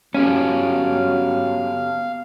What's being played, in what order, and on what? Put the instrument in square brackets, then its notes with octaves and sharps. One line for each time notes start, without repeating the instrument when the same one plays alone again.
[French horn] F#3 [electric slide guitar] B3 G4 A4 [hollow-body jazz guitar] C#4 [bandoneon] F5